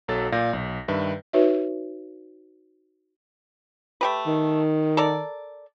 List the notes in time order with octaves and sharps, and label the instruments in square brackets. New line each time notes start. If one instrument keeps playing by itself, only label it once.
[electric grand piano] B1 F#3 A4 A6
A#2 D5 F5 G6 A#6
B1
G2 D#3 B4 E5
[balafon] D#4 F#4 B4 C#5 E5
[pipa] A3 G4 B4
[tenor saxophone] D#3
[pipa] A4 A#4 D5